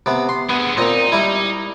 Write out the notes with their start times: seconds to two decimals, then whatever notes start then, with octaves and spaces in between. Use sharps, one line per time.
0.06 C3 B3
0.29 C6
0.49 D3 B3 G#4
0.77 A#2 C4 D#5 A#5
1.12 G3 E4